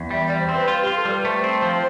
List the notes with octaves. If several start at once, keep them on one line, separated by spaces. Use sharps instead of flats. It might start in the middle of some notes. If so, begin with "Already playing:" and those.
Already playing: E2
G3 E5
G3 D5
C5
C4 B4
F4
G4
F4
A4
G3 B4
A3 C5
C4
F3